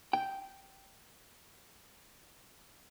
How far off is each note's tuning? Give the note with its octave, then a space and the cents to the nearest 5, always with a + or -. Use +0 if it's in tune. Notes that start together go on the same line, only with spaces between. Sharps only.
G5 -10